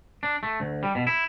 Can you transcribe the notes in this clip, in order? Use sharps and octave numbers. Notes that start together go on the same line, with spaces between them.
D4
A3
D2
G3
B2
E4